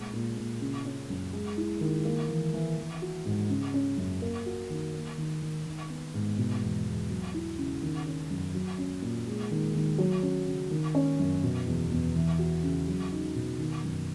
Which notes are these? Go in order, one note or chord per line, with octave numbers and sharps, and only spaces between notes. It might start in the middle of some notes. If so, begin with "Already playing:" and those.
Already playing: A#2 G#3
A#2
A#2
C#3
C#4
F#2
G#3
E4
D#3
A#3
E3
E3
E3
F#4
G#2
C#3
C#4
F#2
A#3
F#4
D#3
A#3
D#3
D#3
D#3
B3
G#2
B2
E2
E2
F#3
E4
C#3
D#3
C#4
F#2
F#3
C#4
A#2
G#3
D#3
D#3
F#3
C#4
C#3
D#3
C#4
F#2
B2
E2
E2
E3
F#4
C#3
F#3
D#4
B2
D#3
F#2